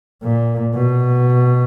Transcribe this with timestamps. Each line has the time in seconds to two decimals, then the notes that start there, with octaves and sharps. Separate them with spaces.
0.23 A#2
0.75 B2